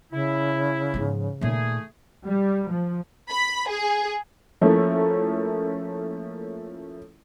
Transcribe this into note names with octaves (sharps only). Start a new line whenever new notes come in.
C#3 E4
G#2 F3
A#2 D#3 A3 G#4
G3
F3
B5
G#4
F3 A3 A#3 C#4 E4